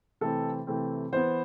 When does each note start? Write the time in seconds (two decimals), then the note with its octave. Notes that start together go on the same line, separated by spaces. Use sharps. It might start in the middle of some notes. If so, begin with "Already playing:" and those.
0.21 C3 E3 A3 C4 A4
0.67 C3 E3 A3 C4
1.12 E3 B3 C5